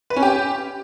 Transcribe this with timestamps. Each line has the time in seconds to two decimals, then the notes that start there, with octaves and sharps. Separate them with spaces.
0.10 B4
0.16 C#4
0.22 G4